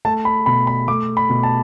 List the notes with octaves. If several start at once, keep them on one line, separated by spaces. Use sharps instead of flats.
A3 A5
B5
B2 B5
B5
A3 D6
B5
B2
A5